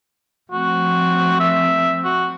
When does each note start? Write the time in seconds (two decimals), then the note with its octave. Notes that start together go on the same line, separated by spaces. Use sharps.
0.52 F3 A3 C4 F#4
1.40 E5
2.05 F#4